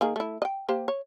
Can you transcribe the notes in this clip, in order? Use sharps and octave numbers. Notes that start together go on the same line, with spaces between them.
D#3 A#3 G#4
A3 E4
D#5 G5
A#3 G4 C5
C#5